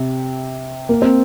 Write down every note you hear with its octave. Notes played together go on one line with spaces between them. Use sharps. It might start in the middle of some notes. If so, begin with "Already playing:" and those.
Already playing: C3
A#3
C4